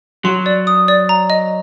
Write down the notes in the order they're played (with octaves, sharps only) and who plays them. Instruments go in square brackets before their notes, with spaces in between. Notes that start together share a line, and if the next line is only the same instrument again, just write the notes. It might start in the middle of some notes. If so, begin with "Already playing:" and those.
[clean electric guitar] F#3 [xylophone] C6
[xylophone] D5
D#6
D5
A#5
D#5